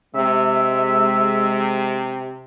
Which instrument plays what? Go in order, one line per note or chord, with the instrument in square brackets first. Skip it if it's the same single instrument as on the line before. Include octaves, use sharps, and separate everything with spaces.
[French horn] C3 [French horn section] G#3 [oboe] E5